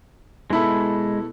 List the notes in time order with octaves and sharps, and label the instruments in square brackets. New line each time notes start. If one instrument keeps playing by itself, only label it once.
[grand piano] B2 E4 A4 [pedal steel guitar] G#3 B5